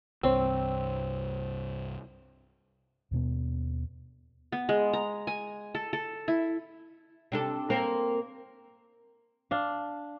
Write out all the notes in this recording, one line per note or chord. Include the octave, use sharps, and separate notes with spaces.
C2 G2 C4 C5 C#5 E6
D#2 B2 B3
B3
G#3
A#5
G#5
A4
A4
E4
C3 D4 A4
A#3 C4 A#4
D4 F5